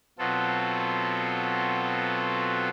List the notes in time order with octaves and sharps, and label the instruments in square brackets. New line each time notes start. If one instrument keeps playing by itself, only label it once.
[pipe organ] B2 F#3 B3 C4 F4 A4